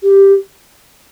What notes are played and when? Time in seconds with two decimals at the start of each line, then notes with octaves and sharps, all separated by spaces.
0.02 G4